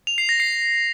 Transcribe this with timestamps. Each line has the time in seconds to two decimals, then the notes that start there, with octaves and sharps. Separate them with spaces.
0.07 F7
0.18 C7
0.29 A#6
0.40 C7